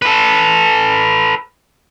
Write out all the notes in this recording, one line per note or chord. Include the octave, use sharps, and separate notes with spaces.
A4 B4